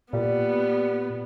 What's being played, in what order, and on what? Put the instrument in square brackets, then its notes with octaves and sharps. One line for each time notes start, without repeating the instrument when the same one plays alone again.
[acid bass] A#2 [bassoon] G3 [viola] B3